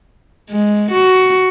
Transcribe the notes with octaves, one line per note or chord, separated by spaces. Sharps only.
G#3
F#4